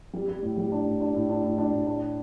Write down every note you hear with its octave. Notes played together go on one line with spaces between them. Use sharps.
G3
G3
A2
G3
D4
A2
D4
A2
D4
A2
D4
A2
D4